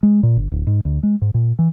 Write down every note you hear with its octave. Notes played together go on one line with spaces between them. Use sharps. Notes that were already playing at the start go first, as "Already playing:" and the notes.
G#3
A#2
G1
D1
G#2
D2
G#3
G#2
A#2
E3